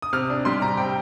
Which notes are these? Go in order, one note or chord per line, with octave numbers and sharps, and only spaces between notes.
D#6
C3 F6
D4
G3 C6
C3 A#5
C3 G5